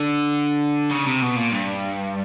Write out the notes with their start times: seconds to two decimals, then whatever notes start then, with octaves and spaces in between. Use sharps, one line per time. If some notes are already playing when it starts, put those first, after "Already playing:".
Already playing: D3
0.91 C#3
1.07 C3
1.22 B2
1.36 A#2
1.52 G2